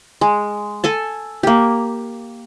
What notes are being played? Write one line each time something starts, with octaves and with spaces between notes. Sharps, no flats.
G#3
A4 G#5 A5
A#3 G4